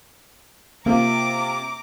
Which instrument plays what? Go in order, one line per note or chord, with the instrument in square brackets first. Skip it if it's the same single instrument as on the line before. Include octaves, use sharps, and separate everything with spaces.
[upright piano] C3 F4 [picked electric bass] A#3 [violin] A#5 D6